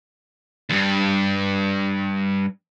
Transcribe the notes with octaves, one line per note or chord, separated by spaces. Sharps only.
D2 G2